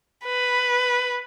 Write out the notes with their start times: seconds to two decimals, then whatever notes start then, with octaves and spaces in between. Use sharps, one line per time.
0.25 B4